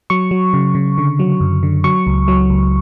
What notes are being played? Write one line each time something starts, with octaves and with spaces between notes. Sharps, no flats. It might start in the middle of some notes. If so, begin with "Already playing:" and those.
F#3 C#6
F#3
C#3
C#3
D3
F#3
F#2
D3
F#3 C#6
C#2
F#3
C#2